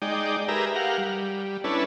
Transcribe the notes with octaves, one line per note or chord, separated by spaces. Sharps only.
G#3 D#4 D5 G5
G4 G#4 A#4 B4 E5 A#5
G4 A#4 F5 F#5
G3
C#4 D4 E4 A4 B4